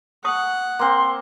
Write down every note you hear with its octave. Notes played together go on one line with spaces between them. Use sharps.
F#5 A5 C#6 D#6
A#3 C4 C6